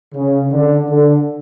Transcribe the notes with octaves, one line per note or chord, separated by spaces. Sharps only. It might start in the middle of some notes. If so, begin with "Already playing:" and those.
C#3
D3
D3